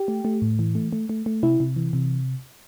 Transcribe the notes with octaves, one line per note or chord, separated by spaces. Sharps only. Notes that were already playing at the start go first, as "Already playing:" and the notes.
Already playing: G4
A3
A3
A2
E3
A3
A3
A3
A3
C3 E4
C3
E3
C3